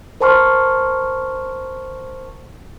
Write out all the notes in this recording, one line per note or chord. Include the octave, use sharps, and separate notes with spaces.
A#4 C5 A5 C6 C#6 F6